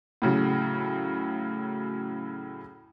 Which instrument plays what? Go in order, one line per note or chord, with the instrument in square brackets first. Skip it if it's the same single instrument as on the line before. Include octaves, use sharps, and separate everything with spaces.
[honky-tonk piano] A2 C#3 F#3